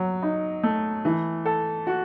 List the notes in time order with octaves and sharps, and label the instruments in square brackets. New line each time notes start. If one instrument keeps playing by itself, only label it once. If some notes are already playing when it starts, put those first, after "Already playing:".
Already playing: [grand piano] F#3
D#4
A3
E3
A4
F#4